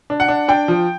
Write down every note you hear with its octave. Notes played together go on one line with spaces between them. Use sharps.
D4
F#5
D4
D4 G5
F3